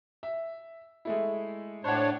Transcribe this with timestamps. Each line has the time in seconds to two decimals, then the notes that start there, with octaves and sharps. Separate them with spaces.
0.23 E5
1.05 G#3 A3 E4
1.84 A2 D4 C5 C#5 F#5